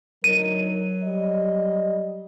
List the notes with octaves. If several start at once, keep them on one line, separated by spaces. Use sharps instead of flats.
D2 F#3 D#4 A#4 D#7
G3 D#5